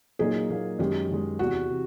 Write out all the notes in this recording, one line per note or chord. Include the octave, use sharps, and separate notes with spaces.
A#2 F#3 A#3 D#4 G#4
A#2 F#3 A#3 D#4
F#2 D#3 G#3 G4
F#2 D#3 G#3
E2 C3 E3 F#4
C3 E3